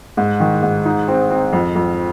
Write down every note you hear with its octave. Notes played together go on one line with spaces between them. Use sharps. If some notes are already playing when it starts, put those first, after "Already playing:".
G#2
D#3
G#2
D#4
C4
C4
F2
F2